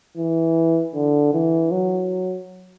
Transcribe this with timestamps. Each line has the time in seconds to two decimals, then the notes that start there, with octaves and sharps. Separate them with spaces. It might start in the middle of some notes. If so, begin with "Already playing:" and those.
0.17 E3
0.94 D3
1.33 E3
1.71 F#3